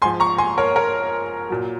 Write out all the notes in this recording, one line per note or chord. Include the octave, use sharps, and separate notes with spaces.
G#2 F3 G#5 C6
A#5 C#6
G#5 C6
A#4 C#5
A#4 C#5
A#2 F#3